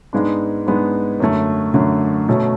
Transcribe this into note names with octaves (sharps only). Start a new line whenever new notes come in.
G#2 G#3 B3 D4
G#2 G#3 B3 D4
F#2 D3 A3
F#2 D3 A3
B2 A3 C#4